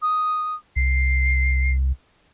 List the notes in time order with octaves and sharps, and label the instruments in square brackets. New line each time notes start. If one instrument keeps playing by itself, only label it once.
[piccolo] D#6
[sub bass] C2 [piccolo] C7